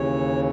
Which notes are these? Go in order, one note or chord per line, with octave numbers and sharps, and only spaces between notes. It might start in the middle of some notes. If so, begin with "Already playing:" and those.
Already playing: D#2 C#3 E3 C#5